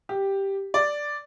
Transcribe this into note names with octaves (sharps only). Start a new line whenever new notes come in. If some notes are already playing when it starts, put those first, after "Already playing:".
G4
D5